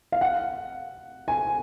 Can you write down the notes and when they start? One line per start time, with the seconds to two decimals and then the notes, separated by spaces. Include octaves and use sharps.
0.12 F5
0.21 F#5
1.28 G#5